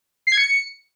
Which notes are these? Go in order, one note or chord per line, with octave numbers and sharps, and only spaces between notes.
C7
G#6
C#7